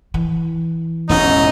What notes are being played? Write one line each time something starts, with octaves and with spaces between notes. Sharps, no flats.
E3
E1 A1 C#4 D#4